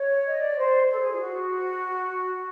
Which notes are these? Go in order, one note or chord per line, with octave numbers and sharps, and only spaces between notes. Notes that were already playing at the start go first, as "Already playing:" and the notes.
Already playing: C#5
D#5
D5
C5
A4
G#4
F4
F#4